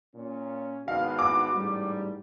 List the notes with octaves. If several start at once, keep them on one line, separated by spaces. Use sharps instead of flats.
A#2 C#4
G#1 B3 F#4 F5
D6
A1 G#2 G3